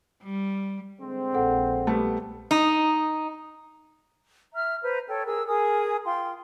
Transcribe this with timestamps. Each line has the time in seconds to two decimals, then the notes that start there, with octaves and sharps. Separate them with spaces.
0.23 G3
1.01 D3 G#3 C4
1.34 A#1 A4 F#5
1.87 G3 A3 B3
2.51 D#4
4.54 E5 A#5 F6
4.84 B4 C5 A#5
5.08 A4 C#5 G5
5.26 G#4 A#4 E6
5.47 G#4 A#4 G#5 D#6
6.04 F4 G5 C6